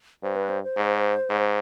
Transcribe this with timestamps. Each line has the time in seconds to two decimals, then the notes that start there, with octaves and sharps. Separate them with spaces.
0.23 G2 C5
0.36 B4
0.50 C5
0.63 C5
0.77 G#2
1.30 G#2